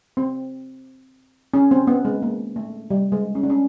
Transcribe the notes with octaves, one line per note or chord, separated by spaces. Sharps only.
C4
C#4
C4
B3
G#3
A#3
A3
G3
G#3
C#4
D4
C#4